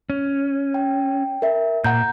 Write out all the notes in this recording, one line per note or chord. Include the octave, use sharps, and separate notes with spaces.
C#4
G5
A#4 E5
A#2 F#5 A#5 G6